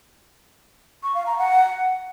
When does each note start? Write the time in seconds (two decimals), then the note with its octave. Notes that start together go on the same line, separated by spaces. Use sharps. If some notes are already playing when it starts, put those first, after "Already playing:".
1.03 C#6
1.15 F5
1.26 A#5
1.38 F#5